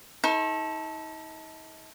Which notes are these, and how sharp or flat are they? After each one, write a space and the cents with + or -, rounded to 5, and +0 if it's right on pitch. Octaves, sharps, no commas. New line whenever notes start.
D#4 +40 A4 +0 C#6 -40